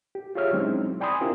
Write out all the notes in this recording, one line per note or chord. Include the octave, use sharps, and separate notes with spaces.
G4
F4 G4 G#4 C#5 E5 F6
F#3 G#3 C4 C#4 D#4 E4
D5 G5 G#5 B5 C6 D#6
C4 D4 E4 F4 G4 A#4